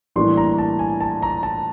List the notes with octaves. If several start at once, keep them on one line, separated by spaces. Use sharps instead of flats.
A2 E3 G3 A#3 D4 C6
A#5
A5
G#5
A5
A#5
A5